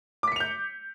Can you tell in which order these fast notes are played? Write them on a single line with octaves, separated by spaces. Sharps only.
D6 B6 C#7 F7 G6